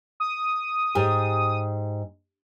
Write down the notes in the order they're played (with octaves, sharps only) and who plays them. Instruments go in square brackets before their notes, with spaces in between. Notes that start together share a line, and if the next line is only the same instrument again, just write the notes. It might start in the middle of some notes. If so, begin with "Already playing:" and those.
[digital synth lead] D#6
[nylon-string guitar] G#2 G4 G#5